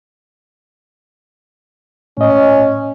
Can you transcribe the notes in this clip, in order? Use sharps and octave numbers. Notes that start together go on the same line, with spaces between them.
A2 C#4 D#5